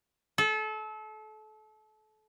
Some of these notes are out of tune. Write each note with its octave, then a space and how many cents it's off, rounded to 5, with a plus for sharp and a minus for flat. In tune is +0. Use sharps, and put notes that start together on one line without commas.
A4 -30